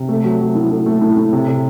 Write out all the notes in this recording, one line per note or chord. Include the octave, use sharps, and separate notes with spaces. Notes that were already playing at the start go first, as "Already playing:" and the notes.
Already playing: C3
A3
F#3
F#3
A2
A2
A3
A2
A2
C3
C3